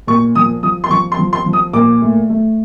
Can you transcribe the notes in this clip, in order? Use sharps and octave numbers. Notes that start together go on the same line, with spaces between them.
A#2 C#6
F3 D#6
F3 D#6
C6
F3 C#6
C6
F3
C6
F3
D#6
A#2 D6
A3
A3